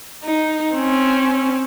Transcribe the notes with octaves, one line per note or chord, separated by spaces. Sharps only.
D#4
C4 C#4